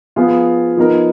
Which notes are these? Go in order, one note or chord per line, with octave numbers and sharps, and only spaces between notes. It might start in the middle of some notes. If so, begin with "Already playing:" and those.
F3 B3 F4 G#4
F3 B3 D#4 A#4